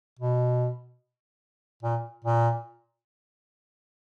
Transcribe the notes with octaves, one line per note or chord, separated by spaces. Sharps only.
B2
A#2
A#2